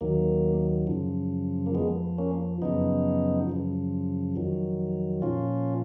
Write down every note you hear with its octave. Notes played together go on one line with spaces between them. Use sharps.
D#2 D#3 F#3 A#3
F#2 C#3 F3
A#3
F2 F3 G#3 B3
A#3 C#4
F#2 C#3 F3 B3 D#4
F#2 C#3 F3
F2 D#3 F#3
A#2 F3 C#4 F4